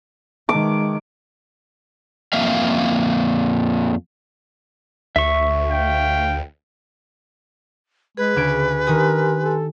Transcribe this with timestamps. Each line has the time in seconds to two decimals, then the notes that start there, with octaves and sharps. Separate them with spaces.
0.49 D#3 G#3 D6
2.33 F2 A#3 E5 F5
5.16 D2 E5 C#6
5.70 F5 G5
8.17 G#3 G#4 B4
8.36 D2 C#3 G#5 D7
8.87 D#3 G4 A#4 G#5 C6 D#6
9.43 A4